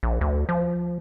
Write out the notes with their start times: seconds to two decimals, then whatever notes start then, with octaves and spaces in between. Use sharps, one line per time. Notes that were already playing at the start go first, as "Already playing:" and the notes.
0.03 A#1
0.21 D2
0.49 F3